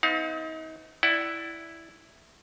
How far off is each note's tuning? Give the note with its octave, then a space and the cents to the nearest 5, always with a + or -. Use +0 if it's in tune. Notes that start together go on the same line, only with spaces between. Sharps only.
C4 -40 D#4 +35 F5 +35
E4 +0 D5 +0 F#5 +20